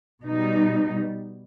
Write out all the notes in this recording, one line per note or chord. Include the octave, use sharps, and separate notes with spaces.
B2 G3 D#4